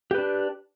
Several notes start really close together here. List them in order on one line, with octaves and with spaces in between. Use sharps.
G4 B4 D4